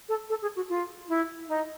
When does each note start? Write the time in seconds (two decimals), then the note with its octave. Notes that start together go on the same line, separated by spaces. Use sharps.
0.08 A4
0.29 A4
0.42 G#4
0.56 F#4
0.69 F4
1.08 E4
1.48 D#4